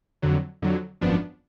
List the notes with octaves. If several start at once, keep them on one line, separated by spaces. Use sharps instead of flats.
F2 D3 F#3
F2 D3 F#3
G#1 F#2 F3 B3 D4